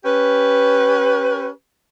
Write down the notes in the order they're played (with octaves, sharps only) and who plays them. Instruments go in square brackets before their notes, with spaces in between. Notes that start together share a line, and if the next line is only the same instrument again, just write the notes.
[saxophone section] C#4 G4 B4